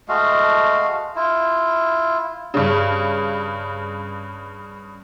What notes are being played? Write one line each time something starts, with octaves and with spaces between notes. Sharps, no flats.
G#3 A3 F#4 F5
E4 F4
G2 C#3